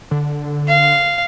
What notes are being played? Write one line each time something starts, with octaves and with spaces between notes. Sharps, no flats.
D3
F5